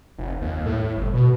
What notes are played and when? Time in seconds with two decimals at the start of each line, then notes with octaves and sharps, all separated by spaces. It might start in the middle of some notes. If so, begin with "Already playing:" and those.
0.18 F1
0.41 D#2
0.66 A2
0.97 G1
1.13 B2